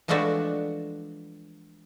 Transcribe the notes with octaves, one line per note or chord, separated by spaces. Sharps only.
E3 F3 G#3 A3 D4 F#4